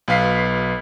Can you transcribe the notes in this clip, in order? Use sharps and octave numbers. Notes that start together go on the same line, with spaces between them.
B1 B3 F5 B6 C7